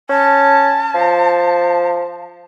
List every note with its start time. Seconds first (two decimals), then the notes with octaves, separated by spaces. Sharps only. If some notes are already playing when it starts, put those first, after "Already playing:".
0.09 C#4 A5
0.94 F3